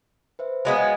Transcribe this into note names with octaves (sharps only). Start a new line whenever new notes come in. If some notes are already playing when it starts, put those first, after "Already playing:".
B4 C5 E5
F#3 G#3 B3 F5 B5 D#6